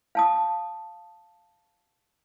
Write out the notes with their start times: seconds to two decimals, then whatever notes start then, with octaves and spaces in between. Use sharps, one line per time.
0.15 F5 A5 D#6